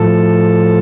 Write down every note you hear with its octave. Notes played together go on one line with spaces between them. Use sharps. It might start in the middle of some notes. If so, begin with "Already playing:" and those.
Already playing: A2 F3 A4